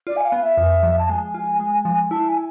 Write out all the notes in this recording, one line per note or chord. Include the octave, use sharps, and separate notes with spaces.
F4 D5
G#5
F5
B3
E5
F2
F3
A5
G#3 G#5
F4
G#3
F3
E4 A5
G#5